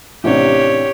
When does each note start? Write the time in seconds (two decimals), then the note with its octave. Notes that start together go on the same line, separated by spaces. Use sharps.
0.24 A1 C3 D4 G4 C#5